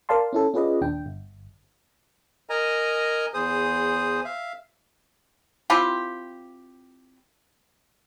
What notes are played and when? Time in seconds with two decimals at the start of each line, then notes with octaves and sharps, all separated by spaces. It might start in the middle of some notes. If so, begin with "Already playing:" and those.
0.09 A#4 D5 F5 A5 C6
0.33 C#4 E4 A4
0.54 C#4 F4 G#4 B4 D5 D#5
0.81 A#1 D#2 D4 G5
1.06 G1
2.50 A#4 D#5 G#5 A#5
3.34 E2 G#4 C5 D#6
4.25 E5 F5
5.70 C4 E4 F4 G4